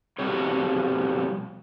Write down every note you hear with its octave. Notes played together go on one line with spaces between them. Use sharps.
F2 B2 G3 C#5